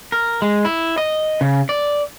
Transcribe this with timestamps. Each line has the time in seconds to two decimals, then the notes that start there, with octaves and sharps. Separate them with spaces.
0.12 A#4
0.42 G#3
0.65 E4
0.98 D#5
1.41 C#3
1.69 D5